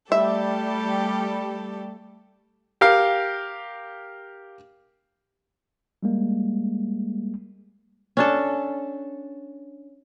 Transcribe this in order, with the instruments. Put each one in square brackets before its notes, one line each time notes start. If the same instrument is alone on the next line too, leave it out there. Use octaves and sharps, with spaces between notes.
[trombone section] G3 [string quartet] A3 G4 A4 [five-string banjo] E5
[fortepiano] G4 A#4 F5
[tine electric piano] G3 G#3 A#3
[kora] C#4 D4 A4